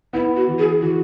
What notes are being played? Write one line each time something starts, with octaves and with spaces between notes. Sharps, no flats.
B3 E4
F#4
E3
G#4
E3 F#4